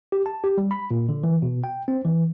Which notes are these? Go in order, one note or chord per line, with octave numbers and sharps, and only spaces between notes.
G4
A5
G4
G3
B5
A#2
D3
E3
B2
G5
C4
E3